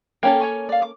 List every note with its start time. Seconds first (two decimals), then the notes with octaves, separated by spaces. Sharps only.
0.23 A#3 C#4 A4 G5
0.40 C#5 G#5 C#6
0.69 D5 F5
0.82 D6